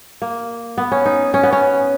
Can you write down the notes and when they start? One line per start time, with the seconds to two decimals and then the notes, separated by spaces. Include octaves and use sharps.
0.22 A#3
0.78 B3
0.92 C#4
1.05 D#4
1.34 C#4
1.43 B3
1.53 C#4